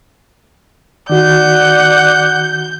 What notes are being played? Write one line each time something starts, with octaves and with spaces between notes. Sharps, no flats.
D#3 F#4 D5 F#5 G6